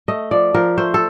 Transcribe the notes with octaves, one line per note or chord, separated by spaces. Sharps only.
A3 D#5
F3 D5
F3 A#4
A3 C5
A4